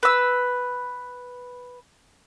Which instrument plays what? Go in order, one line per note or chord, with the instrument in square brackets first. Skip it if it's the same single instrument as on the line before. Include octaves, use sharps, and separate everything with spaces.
[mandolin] B4 E6